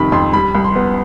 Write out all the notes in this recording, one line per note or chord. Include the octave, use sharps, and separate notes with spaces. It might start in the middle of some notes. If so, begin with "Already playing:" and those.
Already playing: F2 C3 D#3 G3 B5
F2 C6
G3 B5
C2
C6
B3